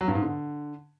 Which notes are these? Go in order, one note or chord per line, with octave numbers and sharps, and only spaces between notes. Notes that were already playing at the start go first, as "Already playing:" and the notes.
F#3
G2
G#2
D3